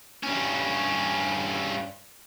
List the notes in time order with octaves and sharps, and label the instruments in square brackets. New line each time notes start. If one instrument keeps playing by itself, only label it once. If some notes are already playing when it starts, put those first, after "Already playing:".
[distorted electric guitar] G2 C#4